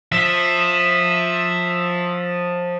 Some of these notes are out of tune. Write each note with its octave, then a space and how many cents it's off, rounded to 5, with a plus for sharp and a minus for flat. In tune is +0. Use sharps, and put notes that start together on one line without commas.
F3 +20 E5 +0